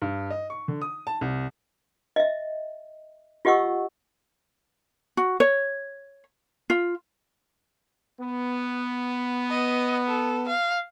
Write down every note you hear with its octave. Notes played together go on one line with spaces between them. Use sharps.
G2
D#5
C#6
D3
D#6
A5
C2
D#5 E5
F4 G4 D#5 F#5 C#6 E6
F#4
C#5
F4
B3
D#5
A4
F5